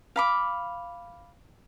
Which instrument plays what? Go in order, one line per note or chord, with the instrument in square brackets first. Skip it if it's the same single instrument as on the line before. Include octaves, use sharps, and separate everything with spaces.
[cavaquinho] F5 B5 D6